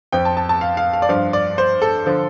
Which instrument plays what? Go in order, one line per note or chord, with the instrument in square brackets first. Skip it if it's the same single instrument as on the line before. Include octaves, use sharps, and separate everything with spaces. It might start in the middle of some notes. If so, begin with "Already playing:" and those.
[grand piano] F2 F3 G5
A5
A5
A5
F5
F5
F5
D5
G2 F3 F5
D5
C5
A4
D3 F3